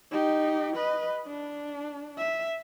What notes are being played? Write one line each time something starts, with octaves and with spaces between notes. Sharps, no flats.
D#4 G4
B4 D#5
D4
E5